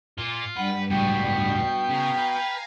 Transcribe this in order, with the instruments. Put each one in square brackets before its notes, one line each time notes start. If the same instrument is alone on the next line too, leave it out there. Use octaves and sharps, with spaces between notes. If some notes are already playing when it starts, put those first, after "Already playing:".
[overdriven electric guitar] A#2 [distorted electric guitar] F4
[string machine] G2 G3 [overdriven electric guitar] B4 [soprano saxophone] F#5
[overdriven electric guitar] C#2 A2 [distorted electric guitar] B3 F#4 [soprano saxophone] G5
[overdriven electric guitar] C#3 [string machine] F5 G#5 A#5
[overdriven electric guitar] B4